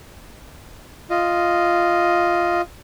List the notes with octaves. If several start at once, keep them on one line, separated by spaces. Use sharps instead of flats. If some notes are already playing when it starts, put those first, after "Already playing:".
F4 D#5